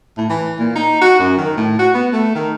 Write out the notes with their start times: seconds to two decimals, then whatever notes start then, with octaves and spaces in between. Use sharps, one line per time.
0.18 A2
0.29 E3
0.59 A#2
0.75 D#4
1.01 F#4
1.19 F#2
1.38 D#3
1.57 A2
1.79 F#4
1.94 B3
2.13 A3
2.35 D#3